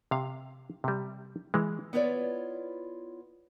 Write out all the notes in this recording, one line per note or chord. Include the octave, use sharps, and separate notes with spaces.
C3 F5
C3 G3
E3 G#3
B3 E4 F4 B4 C#5 D5